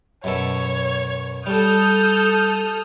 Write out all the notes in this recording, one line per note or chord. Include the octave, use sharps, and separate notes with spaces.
F#2 B2 A4 C#5
G3 A4 D#6 F6 G6